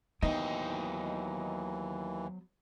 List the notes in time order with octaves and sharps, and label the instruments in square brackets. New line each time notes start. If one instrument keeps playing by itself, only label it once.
[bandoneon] D#2 E3 [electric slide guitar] F#3 C5 G5 [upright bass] B3 E4 [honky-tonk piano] D#4